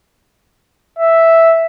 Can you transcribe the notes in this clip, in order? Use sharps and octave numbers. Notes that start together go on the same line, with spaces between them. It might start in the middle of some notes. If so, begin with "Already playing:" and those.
E5